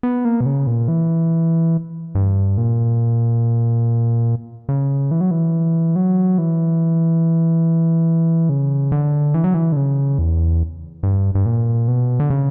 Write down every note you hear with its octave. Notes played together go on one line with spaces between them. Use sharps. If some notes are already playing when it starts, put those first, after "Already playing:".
B3
A#3
B2
C#3
A#2
E3
G2
A#2
C#3
E3
F#3
E3
F#3
E3
C#3
D3
E3
F#3
E3
D3
C#3
E2
G2
G2
A#2
B2
D3
C#3